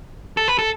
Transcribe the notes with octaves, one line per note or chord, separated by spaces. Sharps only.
A4
B4
A4